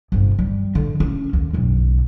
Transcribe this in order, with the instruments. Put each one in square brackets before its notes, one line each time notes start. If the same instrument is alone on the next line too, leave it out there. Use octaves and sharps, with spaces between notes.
[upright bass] G1 C3
G3
D3
A3 C#4
D#2
F#1 B1